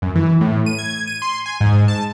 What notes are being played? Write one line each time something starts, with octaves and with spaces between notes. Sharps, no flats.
F#2
E3
A2
D#7
G#6
D#7
C6
G#5
G#2
A5